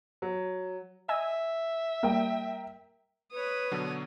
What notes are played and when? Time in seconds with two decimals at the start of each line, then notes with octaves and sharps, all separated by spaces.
0.22 F#3
1.09 D#5 E5 G#5 E6
2.03 G3 A#3 A#4 G5
3.33 B4 C#5 D#6
3.72 B2 D3 F#3